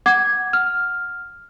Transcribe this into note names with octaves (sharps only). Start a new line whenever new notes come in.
F#5 D6 G#6
F6